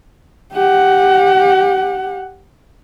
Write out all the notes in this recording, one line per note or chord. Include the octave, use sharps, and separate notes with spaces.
G4 F#5